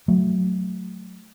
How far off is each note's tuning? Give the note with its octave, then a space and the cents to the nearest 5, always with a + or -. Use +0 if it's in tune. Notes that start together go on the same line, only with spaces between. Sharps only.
F#3 +0 A3 +0